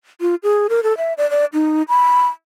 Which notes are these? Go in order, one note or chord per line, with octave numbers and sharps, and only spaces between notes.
F4
G#4
A#4
A4
E5
D5
D5
D#4
B5